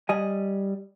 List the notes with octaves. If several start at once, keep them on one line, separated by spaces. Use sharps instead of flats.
G3 D#5 G#5